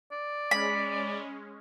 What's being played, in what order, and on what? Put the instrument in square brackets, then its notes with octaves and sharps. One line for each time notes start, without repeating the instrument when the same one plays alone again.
[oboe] D5
[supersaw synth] G#3 C#4 [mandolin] B5